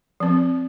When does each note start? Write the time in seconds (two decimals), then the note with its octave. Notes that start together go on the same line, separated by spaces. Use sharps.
0.20 F3 C4